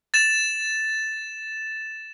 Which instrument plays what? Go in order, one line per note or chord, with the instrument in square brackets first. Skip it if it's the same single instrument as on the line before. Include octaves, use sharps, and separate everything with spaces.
[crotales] A6 E7